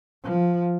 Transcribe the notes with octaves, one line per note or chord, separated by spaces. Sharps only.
F3